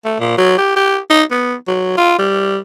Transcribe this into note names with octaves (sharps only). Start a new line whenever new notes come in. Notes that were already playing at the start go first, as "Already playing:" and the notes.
A3
A#2
F#3
G4
G4
D#4
B3
F#3
F4
G3